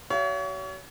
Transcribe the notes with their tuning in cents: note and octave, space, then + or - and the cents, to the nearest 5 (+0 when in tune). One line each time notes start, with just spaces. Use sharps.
F#4 +40 C#5 +35 F5 -40